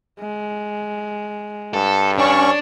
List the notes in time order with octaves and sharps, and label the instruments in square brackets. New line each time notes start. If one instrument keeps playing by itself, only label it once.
[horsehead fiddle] G#3
[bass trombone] G2 [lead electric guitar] A4
[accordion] C#4 C#6 [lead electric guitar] D4 [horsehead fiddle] C#5